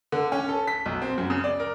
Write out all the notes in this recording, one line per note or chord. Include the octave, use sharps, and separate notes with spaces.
D3
C#4
A4
B6
B1
C4
F#2
C#3
D5
A#4